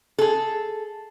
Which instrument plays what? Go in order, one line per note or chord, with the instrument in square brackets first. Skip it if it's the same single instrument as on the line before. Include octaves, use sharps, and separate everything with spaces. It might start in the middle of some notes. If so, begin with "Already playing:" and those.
[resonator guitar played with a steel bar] G#4 A4